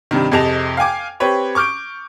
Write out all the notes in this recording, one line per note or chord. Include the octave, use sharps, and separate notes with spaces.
G2 C3 D#3
F2 C3 G#4 D#5 A5 F7
F5 G5 G#5 D6
C4 G4 B4 C#5
C#6 D6 F6 G6 D7